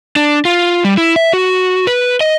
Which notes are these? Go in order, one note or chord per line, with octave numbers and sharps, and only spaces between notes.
D4
F4
G3
E4
E5
F#4
B4
D#5